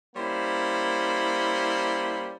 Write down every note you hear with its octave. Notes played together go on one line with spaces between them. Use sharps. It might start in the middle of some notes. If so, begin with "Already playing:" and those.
G3 A#3 C#4 E4 C5 B5